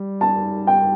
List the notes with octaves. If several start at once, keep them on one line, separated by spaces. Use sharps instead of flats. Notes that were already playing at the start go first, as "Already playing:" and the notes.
Already playing: G3
A5
G5